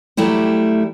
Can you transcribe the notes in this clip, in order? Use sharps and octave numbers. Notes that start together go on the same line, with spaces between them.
F#3 G3 A3 E4 G4